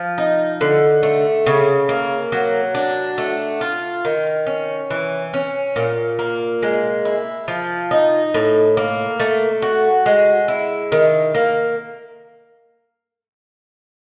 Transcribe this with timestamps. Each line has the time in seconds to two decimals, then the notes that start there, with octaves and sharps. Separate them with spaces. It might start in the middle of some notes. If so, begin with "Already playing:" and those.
Already playing: F3
0.18 D#4
0.61 D3
1.03 A3
1.46 C#3
1.89 A#3
2.32 F#3
2.75 D4
3.18 A3
3.61 F4
4.05 D#3
4.46 C#4
4.90 E3
5.34 C#4
5.76 A#2
6.19 A#3
6.63 G#3
7.05 E4
7.48 F3
7.91 D#4
8.34 A2
8.77 A#3
9.20 A3
9.62 F#4
10.06 G#3
10.48 E4
10.92 D#3
11.35 A#3